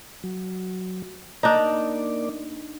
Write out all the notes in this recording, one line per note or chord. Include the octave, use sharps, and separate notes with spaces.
F#3
A#3 D4 D#4 D5